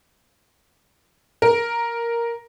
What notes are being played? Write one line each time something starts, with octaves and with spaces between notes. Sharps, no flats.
A#4